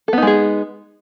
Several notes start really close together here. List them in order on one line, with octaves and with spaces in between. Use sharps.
A4 B3 D#4 G#3 G#4